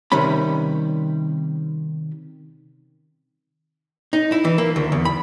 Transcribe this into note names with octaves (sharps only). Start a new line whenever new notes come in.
C3 D#3 G3 C#4 B5
D#4
E4
E3
A#3
D2
E2
B5